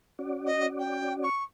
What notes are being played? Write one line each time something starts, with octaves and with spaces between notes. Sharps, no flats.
C#4 F#4 D5
D#5
G5
C#6